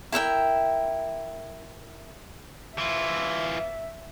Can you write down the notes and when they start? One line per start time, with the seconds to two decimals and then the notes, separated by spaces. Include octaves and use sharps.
0.12 E4 A#4 E5 G5
2.78 E3 F4 E5